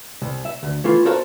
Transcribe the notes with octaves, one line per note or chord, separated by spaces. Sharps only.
C2
E5
D2
E3 A3 F4
F#4 A4 A#4 C5 C#5 F5